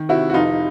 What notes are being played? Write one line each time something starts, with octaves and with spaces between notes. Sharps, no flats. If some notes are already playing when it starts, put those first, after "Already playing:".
Already playing: D#3
C3 E4 F#4
F#4
F1 D#4 F4